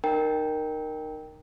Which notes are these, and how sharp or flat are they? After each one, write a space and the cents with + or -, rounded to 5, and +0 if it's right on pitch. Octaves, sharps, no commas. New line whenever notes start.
D#4 -25 A#4 +0 G5 +0